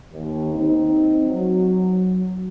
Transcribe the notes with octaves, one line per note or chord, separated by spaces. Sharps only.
D#2
C4 D#4
F#3